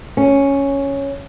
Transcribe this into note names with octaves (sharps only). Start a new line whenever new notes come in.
C#4